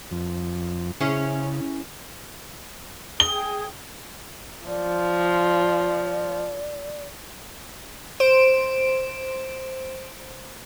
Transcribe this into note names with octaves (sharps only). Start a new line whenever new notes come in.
F2
C#3 C#4 E4 G#4
G#4 G5 D#6 G7
F3 D5
C5 D7 E7